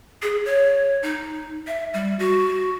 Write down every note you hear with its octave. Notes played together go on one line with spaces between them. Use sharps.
G#4
C#5
D#4
E5
G3
F#4